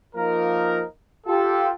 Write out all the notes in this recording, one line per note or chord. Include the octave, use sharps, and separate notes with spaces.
F3 A#3 D#4 F4 A#4
F4 G4 A4